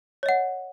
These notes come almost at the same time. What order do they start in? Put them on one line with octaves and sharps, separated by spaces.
C#5 D#5 F#5